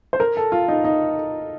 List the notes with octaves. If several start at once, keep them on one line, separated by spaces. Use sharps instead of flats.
C5
A#4
A4
F4
D#4
D#4